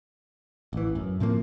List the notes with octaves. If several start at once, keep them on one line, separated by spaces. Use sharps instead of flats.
A1 E3
F#2
A2 C3 F3 A#3